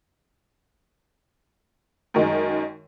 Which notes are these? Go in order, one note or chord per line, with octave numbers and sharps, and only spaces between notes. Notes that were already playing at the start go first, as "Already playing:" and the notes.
F#2 D#3 G#3